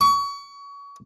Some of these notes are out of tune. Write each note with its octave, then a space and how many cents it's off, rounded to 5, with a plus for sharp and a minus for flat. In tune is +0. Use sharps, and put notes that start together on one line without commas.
C#6 +30